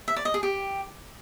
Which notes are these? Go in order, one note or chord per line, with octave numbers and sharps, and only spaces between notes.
E5
D5
D#5
G#4
G4